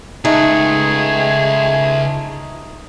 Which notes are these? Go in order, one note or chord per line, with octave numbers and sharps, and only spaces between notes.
C#2 A3 D#4 G#4